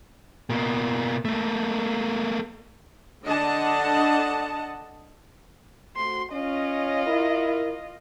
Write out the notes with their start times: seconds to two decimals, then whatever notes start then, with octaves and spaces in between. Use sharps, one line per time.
0.50 B2 A#3
1.25 A3 A#3
3.24 D3 D4 D#5 F#5 A5
5.96 A3 C4 F#4 C6
6.32 C#4 F4 D#5
7.06 E4 A#4